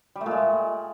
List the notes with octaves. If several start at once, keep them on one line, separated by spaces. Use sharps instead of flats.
G3
A3
A#2
G#3